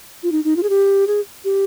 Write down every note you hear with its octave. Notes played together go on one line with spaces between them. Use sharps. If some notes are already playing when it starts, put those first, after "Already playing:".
F4
D#4
D#4
F4
G#4
G4
G#4
G4